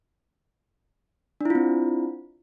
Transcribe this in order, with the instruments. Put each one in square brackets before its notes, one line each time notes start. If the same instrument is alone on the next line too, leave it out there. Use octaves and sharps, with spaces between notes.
[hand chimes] D4
E4
F4
C4